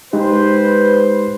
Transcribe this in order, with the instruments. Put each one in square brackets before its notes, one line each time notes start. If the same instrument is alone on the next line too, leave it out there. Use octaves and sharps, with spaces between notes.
[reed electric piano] G#3 D#4 G4 [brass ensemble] B4 [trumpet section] C5